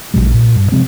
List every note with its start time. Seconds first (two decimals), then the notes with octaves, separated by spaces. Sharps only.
0.14 A#1 B2 F#3 G#3
0.34 A#2
0.56 G2
0.72 C3 F3 G#3 C4